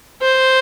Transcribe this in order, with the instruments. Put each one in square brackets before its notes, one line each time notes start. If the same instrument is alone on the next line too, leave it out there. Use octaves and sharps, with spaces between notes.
[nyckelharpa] C5